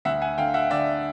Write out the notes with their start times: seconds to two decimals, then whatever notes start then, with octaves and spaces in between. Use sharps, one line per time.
0.05 D2 E5 F#5
0.22 F#5 G#5
0.38 D3 F5 G5
0.54 E5 F#5
0.70 D3 D5 E5